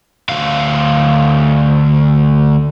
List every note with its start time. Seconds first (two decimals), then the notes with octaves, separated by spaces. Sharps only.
0.29 D2 F5